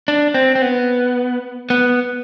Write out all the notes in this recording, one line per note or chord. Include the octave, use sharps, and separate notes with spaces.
D4
C4
C4
B3
B3